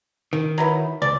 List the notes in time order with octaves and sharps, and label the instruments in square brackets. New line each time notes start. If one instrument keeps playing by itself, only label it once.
[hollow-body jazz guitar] D#3
[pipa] F#3 B3 E4
[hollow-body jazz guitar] C#2 [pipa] D5